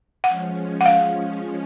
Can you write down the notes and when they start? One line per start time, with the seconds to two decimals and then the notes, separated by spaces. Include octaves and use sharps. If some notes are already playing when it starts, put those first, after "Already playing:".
0.24 F3 G#3 C#4 F#5
0.81 F#5
0.86 F5